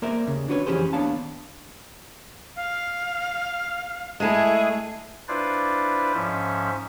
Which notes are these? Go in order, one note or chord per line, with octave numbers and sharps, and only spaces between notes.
A#3 A#4 C5 D5 E5
D#2 C#3
D4 F#4 B4 C#5
F2 E3 C#4 G4 G#4 C5
D#2 B3 D4 C#5 F5 A5
F5
G#3 A3 E4 G#4
D4 E4 F4 B4 C5 D5
G#2 F3 C#4 E5